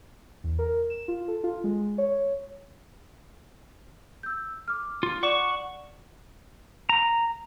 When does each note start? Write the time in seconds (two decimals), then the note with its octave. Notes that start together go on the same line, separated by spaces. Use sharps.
0.44 E2
0.59 A#4
0.90 E7
1.08 F4
1.28 A4
1.44 F4
1.64 G#3
1.98 C#5
4.23 E6 G6
4.68 D6 F6
5.03 F4
5.23 D5 F#5 C#6 D6 E7
6.89 A#5